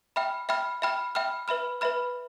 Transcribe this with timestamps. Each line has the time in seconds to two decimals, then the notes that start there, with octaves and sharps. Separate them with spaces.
0.16 E5 G5 B5 F6
0.49 E5 G5 B5 F6
0.82 E5 G5 B5 F6
1.15 E5 G5 B5 F6
1.48 B4 E5 B5 F6
1.81 B4 E5 B5 F6